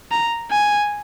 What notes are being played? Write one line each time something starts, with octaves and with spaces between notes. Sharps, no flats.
A#5
G#5